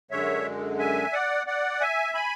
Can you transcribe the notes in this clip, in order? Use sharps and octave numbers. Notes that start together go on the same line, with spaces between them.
F#2 D3 G#3 C#5 E5
E5 G#5
D5 F#5
D5 F#5
E5 G#5
G#5 B5